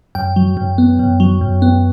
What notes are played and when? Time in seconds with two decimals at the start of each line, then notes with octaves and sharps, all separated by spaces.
0.15 F#2 G5
0.36 F#3
0.57 F#2
0.78 B3
0.99 F#2
1.20 F#3
1.41 F#2
1.62 B3